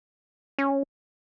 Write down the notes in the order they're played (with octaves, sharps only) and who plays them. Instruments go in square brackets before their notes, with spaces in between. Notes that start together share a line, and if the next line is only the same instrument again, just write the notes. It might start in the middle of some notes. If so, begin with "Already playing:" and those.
[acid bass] C#4